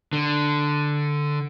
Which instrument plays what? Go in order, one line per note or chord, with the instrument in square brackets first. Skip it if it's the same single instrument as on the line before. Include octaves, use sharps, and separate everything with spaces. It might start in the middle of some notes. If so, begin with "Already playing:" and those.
[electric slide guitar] D3